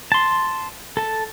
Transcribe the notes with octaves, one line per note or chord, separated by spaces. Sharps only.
A5 C6
A4 A5